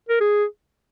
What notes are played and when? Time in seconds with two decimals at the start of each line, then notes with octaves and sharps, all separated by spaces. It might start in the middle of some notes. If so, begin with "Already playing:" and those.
0.09 A#4
0.21 G#4